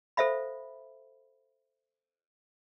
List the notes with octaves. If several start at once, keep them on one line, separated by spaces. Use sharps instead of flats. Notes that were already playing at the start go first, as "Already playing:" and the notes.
A4 C5 E5 F5 B5